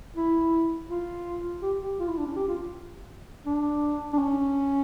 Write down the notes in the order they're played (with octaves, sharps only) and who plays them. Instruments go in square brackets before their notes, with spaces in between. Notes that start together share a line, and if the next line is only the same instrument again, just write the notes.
[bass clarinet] E4
F4
G4
G4
F4
E4
D4
C#4
G4
F4
D4
D4
C#4